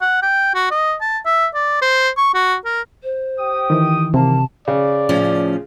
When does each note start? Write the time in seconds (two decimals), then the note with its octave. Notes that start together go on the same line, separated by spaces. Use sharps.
0.02 F#5
0.23 G5
0.55 F#4
0.71 D#5
1.01 A5
1.26 E5
1.54 D5
1.82 C5
2.17 C#6
2.35 F#4
2.65 A#4
3.03 C5
3.38 G4 G5 D#6
3.70 D#3 E3
4.14 C3 A#3 A5
4.68 C#3 D5
5.09 A2 F3 C#4